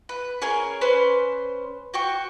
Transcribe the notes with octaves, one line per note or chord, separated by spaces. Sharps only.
B4
C#4 G#4 A#4 G#5
C#4 B4 C5 C6
F#4 G5 C#6